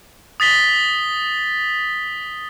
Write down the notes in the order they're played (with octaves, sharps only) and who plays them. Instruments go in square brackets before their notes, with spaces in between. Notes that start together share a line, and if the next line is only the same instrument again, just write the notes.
[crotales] D#6 A6 B6 G7